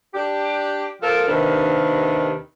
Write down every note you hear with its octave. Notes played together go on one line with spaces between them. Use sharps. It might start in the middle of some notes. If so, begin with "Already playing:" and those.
D4 G4
F3 F4 A4 A#4
D#2 C3 D#3 D4 B4